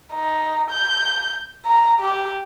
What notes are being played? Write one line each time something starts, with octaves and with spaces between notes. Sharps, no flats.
D#4
G6
A#5
G4